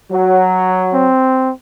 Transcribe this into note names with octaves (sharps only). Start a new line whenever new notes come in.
F#3
C4